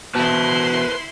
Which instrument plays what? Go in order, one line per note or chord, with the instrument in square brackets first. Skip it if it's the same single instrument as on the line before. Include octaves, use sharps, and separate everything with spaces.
[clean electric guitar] B2 E3 [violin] E4 C6 [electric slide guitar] B4 C5 A5